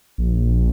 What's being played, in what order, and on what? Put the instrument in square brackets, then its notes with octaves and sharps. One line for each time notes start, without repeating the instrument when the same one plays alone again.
[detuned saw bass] A#1